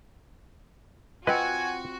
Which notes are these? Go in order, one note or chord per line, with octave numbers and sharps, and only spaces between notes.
C4 F4 F#4 B4 D#5 G#5